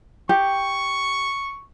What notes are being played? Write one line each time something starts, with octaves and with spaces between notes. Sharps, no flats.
G4 C#6